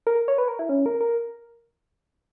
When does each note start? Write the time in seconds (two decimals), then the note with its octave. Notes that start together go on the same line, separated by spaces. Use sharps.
0.07 A#4
0.28 C#5
0.38 B4
0.48 A#4
0.59 E4
0.69 C#4
0.86 A#4
1.01 A#4